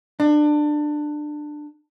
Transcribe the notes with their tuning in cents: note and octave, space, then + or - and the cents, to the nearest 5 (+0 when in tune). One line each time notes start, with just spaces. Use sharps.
D4 +20